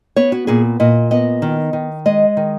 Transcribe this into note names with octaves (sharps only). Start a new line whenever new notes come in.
B3 C#5
F#4
A#2 G#4
A#2 D#5
B3 D#5
D#3
D#3
G#3 D#5
D#3